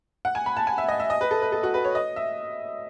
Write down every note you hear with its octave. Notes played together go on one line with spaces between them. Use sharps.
F#5
G#5
B5
A5
G#5
E5
D#5
E5
D#5
B4
A4
B4
A4
F#4
B4
C#5
D#5
E5